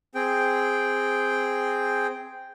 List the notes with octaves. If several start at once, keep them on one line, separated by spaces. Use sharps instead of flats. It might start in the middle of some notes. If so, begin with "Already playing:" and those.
C4 G#4 G5